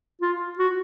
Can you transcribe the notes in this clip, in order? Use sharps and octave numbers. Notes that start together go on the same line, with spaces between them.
F4
F#4